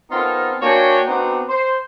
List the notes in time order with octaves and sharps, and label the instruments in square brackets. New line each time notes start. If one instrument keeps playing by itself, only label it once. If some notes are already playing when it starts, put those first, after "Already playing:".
[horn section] B3 C4 D#4 F4 A4 A#4
A#3 D4 F#4 C#5 G5 G#5
B3 C4 D4 D#4 F#4
C5